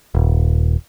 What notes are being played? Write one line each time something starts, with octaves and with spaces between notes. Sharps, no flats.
D#1